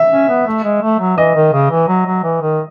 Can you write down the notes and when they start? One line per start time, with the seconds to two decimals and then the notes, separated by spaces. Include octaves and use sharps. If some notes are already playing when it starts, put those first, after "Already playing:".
Already playing: E5
0.11 C#4
0.29 B3
0.47 A3
0.63 G#3
0.82 A3
1.00 F#3
1.17 E3 D#5
1.35 D#3
1.53 C#3
1.70 E3
1.88 F#3
2.06 F#3
2.23 E3
2.42 D#3